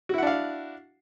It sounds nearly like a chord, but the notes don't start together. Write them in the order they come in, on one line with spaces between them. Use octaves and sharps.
F#4 E4 F#5 D4 F5